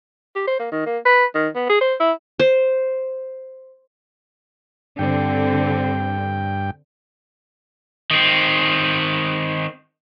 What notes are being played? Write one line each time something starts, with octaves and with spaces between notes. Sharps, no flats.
G4
C5
A#3
D#3
A#3
B4
D#3
B3
G#4
C5
E4
C5
G2 D3 C4 G5
D#3 C4